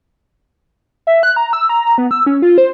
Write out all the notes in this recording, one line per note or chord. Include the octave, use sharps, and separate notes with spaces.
E5
F#6
A#5
E6
A#5
A#5
B3
E6
C#4
F4
C5